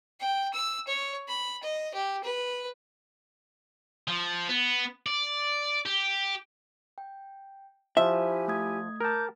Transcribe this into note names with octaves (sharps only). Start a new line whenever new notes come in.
G5
E6
C#5
B5
D#5
G4
B4
F3
B3
D5
G4
G5
F3 E4 G4 C5 E5 G#5
A3 D#6 G#6
A#4 A5 D6 G6